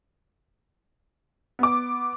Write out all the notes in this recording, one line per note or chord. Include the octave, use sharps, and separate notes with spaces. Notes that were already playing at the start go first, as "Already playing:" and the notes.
B3 D6